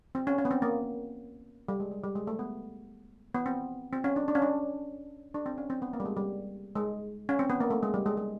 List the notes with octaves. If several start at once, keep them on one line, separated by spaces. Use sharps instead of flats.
C4
C#4
C#4
B3
C4
A#3
G3
G#3
G#3
G3
G#3
A3
B3
B3
C4
C4
C#4
D4
D4
C#4
D4
D4
C4
C#4
C4
B3
A#3
G3
G#3
G3
G#3
C#4
C4
B3
A#3
A3
G#3
G3
G#3
G#3